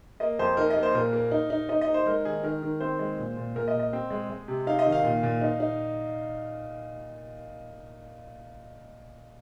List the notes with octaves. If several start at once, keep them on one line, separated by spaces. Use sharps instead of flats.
A#3 D#5
F2 C5
D#4 A#4
D#5
A#3
C5
A#2 A#4
A#3
D#4
D#4
D#4 D#5
D#5
D#4
C5
G#3 A#4
D#3 G#4
D#3 A#4
D#3
C4 C5
G#3
A#2
A#2
A#2 A#4
D#5
A#2
D#5
C4
G#3
G#3
C3
D#4 F5
D#5
D#3
F5
A#2
A#2
D#4
D#4